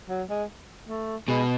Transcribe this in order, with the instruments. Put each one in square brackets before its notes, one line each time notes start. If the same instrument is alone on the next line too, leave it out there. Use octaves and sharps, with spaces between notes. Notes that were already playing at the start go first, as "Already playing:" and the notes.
[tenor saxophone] F#3
G#3
A3
[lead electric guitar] B2 [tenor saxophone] G#3